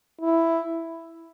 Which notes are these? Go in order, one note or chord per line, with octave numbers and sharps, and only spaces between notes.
E4